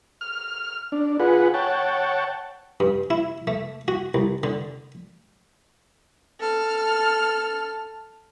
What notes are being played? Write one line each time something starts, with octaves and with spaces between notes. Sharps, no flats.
F6
D4
F4 G#4 B4 F#5
C#5 F#5 G5 A5
G2
E4
A3
F#4
C2
D3
A4 F6